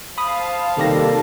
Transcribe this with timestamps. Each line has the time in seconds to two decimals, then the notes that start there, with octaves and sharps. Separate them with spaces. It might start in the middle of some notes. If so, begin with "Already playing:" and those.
0.18 C5 F5 A5 B5 D#6
0.77 C3 D#3 G3 A#3 G4 A4 A#6